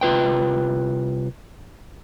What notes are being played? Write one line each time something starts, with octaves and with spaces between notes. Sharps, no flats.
C2 F4 B4 G5